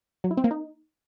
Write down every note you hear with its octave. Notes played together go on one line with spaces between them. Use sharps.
F#3
E4
C4
A#3
D#4